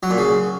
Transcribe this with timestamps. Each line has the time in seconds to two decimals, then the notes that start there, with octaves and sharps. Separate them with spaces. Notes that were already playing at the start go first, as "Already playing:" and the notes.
0.03 F#3
0.10 A#2
0.18 C#3